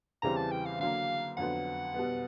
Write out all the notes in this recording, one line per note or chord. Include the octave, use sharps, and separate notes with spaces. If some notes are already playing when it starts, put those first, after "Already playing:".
E2 C#3 E3 G3 C4 A#5
A5
G5
F5
D3 F#3 A#3 F5
F2 D3 F#3 B3 F#5
B2 G3 B3